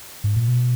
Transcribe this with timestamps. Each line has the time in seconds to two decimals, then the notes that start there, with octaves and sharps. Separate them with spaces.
0.24 G#2
0.36 A#2
0.48 B2